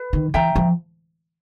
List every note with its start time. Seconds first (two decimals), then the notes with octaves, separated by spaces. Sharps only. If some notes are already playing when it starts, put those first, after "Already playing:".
Already playing: B4
0.13 D#3
0.34 E3 E5 G5 A#5
0.56 F3